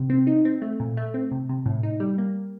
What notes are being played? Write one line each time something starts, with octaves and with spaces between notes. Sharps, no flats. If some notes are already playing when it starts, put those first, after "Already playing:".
Already playing: C3
C4
D#4
C4
A3
A#2
A3
C4
C3
C3
A2
D#4
G3
A#3